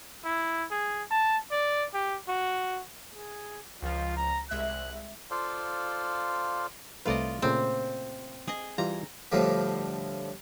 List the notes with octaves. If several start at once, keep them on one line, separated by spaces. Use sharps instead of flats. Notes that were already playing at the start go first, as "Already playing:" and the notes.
E4
G#4
A5
D5
G4
F#4
G#4
C#2 F3 F4
A#5
C2 G#3 E5 F#6
F4 A4 C5 D5 F5
C2 A3 F4 B4 D5 D#5
A#2 C#3 A3 C4
G#4 D#5
E3 G3 F4 A#5
D2 A2 D3 F3 G3